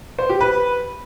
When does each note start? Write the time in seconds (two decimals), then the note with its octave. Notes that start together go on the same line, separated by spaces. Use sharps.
0.19 C5
0.30 G4
0.41 B4